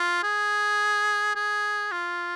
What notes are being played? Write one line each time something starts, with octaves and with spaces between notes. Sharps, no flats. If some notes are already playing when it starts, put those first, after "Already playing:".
Already playing: F4
G#4
G#4
F4